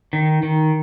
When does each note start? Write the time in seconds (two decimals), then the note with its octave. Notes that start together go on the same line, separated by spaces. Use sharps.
0.13 D#3
0.43 D#3